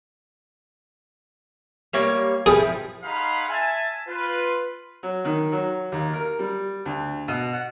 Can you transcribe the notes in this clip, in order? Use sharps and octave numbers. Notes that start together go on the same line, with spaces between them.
G3 A#3 C#5
F3 G3 E4 G#4
D#4 G#4 F5 F#5 B5 C6
E5 G#5 A5
F4 B4
F#3
D#3
F#3
D#2
A#4
G3
D2
B2
F#5